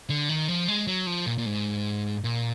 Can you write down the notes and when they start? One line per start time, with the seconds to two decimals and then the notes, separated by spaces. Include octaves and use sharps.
0.09 D3
0.29 D#3
0.48 F3
0.68 G#3
0.87 F#3
1.07 F3
1.26 A#2
1.38 A#2
1.46 G#2
2.24 A#2